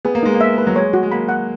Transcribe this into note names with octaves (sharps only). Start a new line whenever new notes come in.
B3 G#4
A#3
G#3 D#4
A#3
E5
B4
F#3
G#3 C#5
F#4
G#3
A#3 B5
F#5